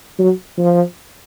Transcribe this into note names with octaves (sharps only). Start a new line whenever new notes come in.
F#3
F3